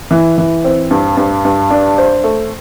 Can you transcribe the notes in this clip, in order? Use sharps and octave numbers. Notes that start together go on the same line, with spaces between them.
E3
E3
C4
G2
G2
G2
D4
C5
A3